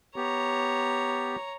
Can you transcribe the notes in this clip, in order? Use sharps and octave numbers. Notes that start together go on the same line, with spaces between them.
B3 G4 C#5 A#5